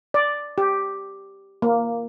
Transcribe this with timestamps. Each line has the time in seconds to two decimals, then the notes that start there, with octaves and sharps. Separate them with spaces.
0.14 D5
0.58 G4
1.62 A#3